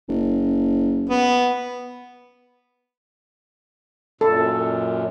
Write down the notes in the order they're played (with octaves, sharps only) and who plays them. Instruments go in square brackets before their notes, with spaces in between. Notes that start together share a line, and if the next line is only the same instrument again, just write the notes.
[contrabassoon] F#1
[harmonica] B3
[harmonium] F#2 A#2 [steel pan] A4